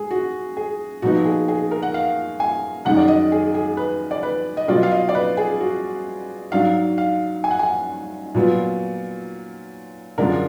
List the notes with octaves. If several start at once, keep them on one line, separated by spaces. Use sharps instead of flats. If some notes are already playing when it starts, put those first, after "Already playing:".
Already playing: G#3 G#4
F#4
G#4
A#2 F3 B3 D#4 F#4
G#4
G#4
A#4
F#5
F5
G#5
F#2 D#3 G#3 D#4 F#5
D5
D#5
G#4
G#4
B4
D5
B4
D#5
B2 F#3 D4 F4 D5
F5
D#5
D5
B4
G#4
F#4
G#2 F#3 D4 F5
F5
G#5
F#5
G#5
A#2 F#3 B3 F4
F#2 D3 G#3 D4 F4 A#4